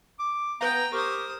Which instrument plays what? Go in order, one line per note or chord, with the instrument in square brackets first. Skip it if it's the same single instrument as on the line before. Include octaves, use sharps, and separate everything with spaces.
[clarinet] D6
[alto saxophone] B3 [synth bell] B4 F5 [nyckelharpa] G5 [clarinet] A#5
[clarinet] G4 [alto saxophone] A#4 [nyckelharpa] C5 D#6 [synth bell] C#6